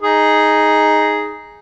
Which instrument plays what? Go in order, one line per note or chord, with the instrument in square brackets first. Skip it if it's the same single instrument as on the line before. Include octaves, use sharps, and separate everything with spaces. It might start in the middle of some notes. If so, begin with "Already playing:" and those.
[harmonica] D#4 G#4